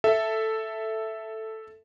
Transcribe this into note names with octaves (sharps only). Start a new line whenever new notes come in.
A4 E5